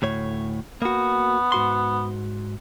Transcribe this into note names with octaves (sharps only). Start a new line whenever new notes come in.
D2 A2 C#5
A#3 B3 F#4
G#2 F#4 C6